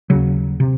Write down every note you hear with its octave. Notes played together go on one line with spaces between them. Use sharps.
D#2 C#3 F#3
C3